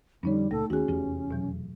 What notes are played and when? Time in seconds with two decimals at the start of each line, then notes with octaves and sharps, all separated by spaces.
0.23 F2 D3 G3 C#4 D#4 C#5
0.51 C#2 A#2 A3 A4
0.70 D#2 C#4 F#4 G#4
0.88 F1 E2 E3 G4
1.31 B2 F#3